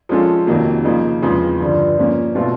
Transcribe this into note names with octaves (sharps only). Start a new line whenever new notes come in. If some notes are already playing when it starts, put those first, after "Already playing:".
F3 G#3 C#4 F4 A4
F2 C3 D#3 F#3 A#3
C#3 F3 A#3 D#4
E2 C#3 F3 G#3 C4
G2 D3 F3
F3 A#3 C#4
B2 F#3 A3 C4 F4